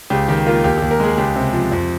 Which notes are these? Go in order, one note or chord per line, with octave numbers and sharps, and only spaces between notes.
C#2 G4
D#3 G4
A#3 F4
D#2 G4
D#2 G4
A#4
G#3 G#4
C#2 G4
C3
F3
F2